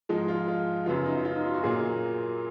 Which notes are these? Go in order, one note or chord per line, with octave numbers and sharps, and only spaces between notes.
G#2 F3 G#3 D#4
F4
F4
F#2 C#3 F#3 B3 F4
D#4
F4
D#4
F4
F#4
A#2 F#3 A#3 G#4